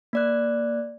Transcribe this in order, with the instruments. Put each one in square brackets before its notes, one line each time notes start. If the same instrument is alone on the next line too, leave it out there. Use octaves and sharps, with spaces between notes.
[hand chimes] A#3 D5 F#6